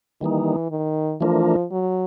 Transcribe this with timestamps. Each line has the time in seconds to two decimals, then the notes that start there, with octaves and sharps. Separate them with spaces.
0.21 D#3 E3 G3 A#3 D#4
0.71 D#3
1.21 E3 F3 A3 D4 F4 A#4
1.71 F#3